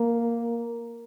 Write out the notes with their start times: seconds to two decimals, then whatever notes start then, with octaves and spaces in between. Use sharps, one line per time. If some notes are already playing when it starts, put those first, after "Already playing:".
Already playing: A#3